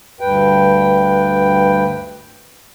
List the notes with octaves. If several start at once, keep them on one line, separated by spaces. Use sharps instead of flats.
D2 G2 B4 G5